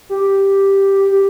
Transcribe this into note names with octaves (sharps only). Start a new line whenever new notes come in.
G4
G4